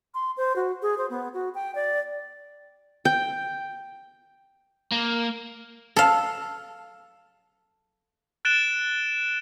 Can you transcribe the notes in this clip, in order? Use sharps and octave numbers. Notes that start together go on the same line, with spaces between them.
C6
C5
F#4
G#4
C5
B3
F#4
G5
D5
G5
A#3
A4 F5
F#6 A6 D7 E7 G7